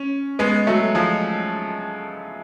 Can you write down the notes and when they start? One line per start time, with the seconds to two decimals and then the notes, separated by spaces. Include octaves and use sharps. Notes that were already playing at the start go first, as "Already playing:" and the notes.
Already playing: C#4
0.39 G#3 B3
0.67 F#3 A3
0.95 F3 G#3